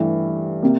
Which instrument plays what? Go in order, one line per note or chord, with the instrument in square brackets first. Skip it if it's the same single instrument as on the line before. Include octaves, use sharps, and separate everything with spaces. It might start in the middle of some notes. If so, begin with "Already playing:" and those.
Already playing: [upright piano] G2 E3 A3 E4 G4
C3 A#3